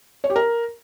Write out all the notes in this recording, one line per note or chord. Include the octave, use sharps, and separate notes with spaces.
C#5
G4
A#4